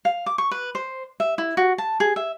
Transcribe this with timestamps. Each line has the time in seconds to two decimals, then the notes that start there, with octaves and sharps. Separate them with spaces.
0.05 F5
0.26 D6
0.38 C#6
0.51 B4
0.75 C5
1.20 E5
1.38 E4
1.57 F#4
1.78 A5
2.00 G#4
2.16 E5